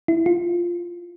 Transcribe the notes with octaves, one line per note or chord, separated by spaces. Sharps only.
E4
F4